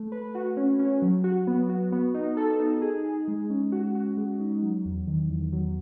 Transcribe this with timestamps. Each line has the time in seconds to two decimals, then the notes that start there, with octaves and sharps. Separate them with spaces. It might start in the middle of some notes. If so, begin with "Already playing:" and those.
Already playing: A3
0.12 B4
0.35 F#4
0.57 C#4
0.79 C#4
1.02 F#3
1.24 F#4
1.47 B3
1.69 F#4
1.92 B3
2.14 D#4
2.37 A4
2.59 D#4
2.82 G#4
3.04 G#4
3.28 G#3
3.50 C#4
3.72 F#4
3.95 F#4
4.17 G#3
4.40 D#4
4.63 F#3
4.85 E2
5.07 D#3
5.30 E2
5.53 F#3